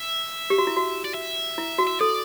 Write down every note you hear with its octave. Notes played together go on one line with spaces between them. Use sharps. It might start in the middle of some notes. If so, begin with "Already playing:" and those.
Already playing: E5
G4
F#4
E4
F#4
D5
E5
E4
F#4
E5
A4 D5